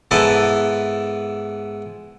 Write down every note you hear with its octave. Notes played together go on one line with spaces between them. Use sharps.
G#2 B3 E4 A4 B4 D5